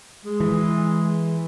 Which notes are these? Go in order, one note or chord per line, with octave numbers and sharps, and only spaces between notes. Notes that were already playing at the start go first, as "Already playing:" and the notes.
G#3
E3